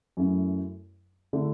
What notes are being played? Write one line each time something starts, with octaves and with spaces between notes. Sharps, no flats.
F#2 F#3 A3 E4
D3 A3 E4